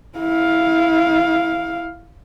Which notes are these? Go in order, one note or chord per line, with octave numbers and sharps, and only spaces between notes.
E4 F5